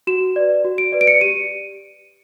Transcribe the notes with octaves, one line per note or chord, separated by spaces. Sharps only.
F#4 E7
B4 D5
F#4
D7
B4 D5
D7
C#7
G4 D#7